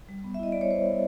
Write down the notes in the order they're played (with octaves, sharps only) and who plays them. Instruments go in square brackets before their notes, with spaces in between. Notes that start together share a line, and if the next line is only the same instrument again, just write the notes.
[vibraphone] G3
B3
E5
E4 D#5
G3 D5
C#5
G3 C5
B3